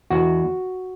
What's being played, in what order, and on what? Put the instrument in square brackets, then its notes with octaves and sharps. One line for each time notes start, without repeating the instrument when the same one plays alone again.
[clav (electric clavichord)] E2 F#4